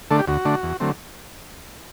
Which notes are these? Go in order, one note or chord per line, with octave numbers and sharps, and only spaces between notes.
D3 A3 D4 A4
G4
D2 F#4
D3 A3 D4
E2
D3 F#3 A3 C4